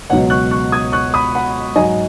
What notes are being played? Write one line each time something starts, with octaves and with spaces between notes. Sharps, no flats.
C#2 B2 F#3 C#5 F#5
C#6 F#6
C#6 F#6
D#6 G#6
C#6 F#6
B5 D#6
F#5 B5
G#2 F#3 D#5 G#5